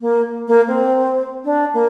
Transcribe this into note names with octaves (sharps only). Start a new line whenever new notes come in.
A#3
A#3
C4
D4
A#3